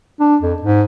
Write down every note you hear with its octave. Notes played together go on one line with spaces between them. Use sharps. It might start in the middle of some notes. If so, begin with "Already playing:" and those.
D4
F2
G#2